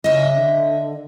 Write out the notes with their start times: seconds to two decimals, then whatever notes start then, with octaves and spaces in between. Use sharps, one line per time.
0.04 C#3 D#5 E5
0.36 D3